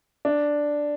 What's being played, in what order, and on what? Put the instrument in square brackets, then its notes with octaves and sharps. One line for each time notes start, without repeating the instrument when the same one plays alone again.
[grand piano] D4